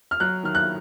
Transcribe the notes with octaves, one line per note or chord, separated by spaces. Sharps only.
F6
F#3 F#6
D#3 F6
F#6